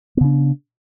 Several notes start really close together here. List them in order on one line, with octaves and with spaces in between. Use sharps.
B3 C#3 D4